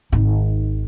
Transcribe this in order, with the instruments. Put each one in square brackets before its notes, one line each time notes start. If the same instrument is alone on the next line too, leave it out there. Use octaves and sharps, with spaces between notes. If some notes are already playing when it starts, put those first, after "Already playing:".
[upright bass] G#1 D#3